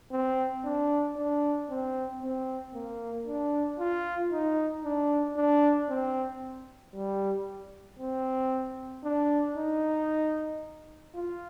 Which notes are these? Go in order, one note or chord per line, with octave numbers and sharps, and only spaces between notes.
C4
D4
D4
C4
C4
A#3
D4
F4
D#4
D4
D4
C4
G3
C4
D4
D#4
F4